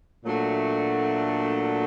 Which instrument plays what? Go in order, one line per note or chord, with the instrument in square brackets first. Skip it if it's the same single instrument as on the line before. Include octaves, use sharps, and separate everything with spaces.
[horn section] A#2 F#3 A3 D4 F#4